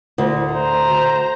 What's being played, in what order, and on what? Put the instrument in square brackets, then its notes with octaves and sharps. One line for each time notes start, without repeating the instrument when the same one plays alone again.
[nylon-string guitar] D2
[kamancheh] C5 A#5